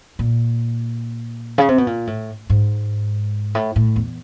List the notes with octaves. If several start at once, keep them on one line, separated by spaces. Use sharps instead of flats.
A#2
C#3
C3
B2
A#2
A2
G#2
A2
A2
E2